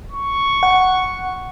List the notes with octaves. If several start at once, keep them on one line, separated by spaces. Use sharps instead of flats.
C#6
F#5